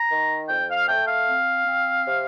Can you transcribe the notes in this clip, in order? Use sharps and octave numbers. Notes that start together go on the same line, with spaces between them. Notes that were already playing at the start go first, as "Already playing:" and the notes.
Already playing: A#5
D#3
F2 G5
F5
A3 G5
F5
C4
C4
C3